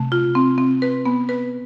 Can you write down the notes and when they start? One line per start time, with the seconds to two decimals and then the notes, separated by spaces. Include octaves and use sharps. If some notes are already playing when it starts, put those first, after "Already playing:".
Already playing: C3 A3
0.12 F4
0.35 C4
0.58 C4
0.82 B4
1.05 B3
1.29 B4